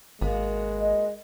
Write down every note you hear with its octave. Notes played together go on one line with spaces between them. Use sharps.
G#1 G#3 A#3 B3 F#4
D#5